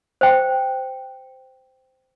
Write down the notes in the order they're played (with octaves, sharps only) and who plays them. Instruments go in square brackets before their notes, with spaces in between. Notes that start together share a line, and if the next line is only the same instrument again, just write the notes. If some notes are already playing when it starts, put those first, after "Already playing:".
[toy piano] C5 G5